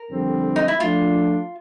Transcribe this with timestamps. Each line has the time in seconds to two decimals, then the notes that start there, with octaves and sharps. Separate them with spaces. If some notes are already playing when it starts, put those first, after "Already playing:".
Already playing: A#4
0.09 F2 D3 G3 C4
0.56 D#4
0.68 E4
0.80 F3 A3 D4 F4